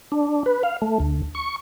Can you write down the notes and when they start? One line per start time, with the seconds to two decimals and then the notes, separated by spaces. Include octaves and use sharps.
0.12 D4
0.46 B4
0.63 F5
0.82 A3
1.00 D2
1.35 C#6